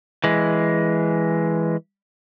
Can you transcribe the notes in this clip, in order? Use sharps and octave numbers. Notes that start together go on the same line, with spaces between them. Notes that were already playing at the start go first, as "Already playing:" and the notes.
E3 G#3